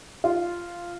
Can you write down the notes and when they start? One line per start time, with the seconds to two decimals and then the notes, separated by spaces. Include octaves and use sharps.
0.24 F4